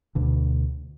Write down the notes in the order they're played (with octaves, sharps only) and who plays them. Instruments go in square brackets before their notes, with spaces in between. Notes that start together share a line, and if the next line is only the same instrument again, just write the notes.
[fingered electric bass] D2 B2 D3